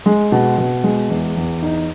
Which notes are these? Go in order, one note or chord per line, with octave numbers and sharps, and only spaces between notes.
G#3
B2
B2
G#3
E2
E2
D#4